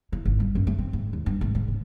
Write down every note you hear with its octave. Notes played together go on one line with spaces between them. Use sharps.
E4
G#1
G3
F#2
A3
C4
G#2
D#2
G2
G#1
G#2
C#3